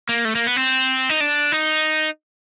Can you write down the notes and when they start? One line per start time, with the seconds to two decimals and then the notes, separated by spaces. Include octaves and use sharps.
0.09 A#3
0.25 A3
0.35 A#3
0.47 B3
0.56 C4
1.09 D#4
1.21 D4
1.52 D#4